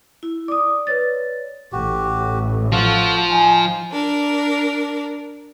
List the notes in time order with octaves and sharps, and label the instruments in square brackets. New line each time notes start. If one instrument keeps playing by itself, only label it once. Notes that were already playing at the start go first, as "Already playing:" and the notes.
[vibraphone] E4
[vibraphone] D5 [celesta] D6 D#6
[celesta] B4 C#5 A6
[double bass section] A1 A2 [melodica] F#4 G4
[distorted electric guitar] F3 [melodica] F#4 A4 F5
[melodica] D#4 G5 [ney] G#5
[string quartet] D4 A#4